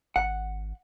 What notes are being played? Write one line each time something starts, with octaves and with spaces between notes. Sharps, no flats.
G#1 F#5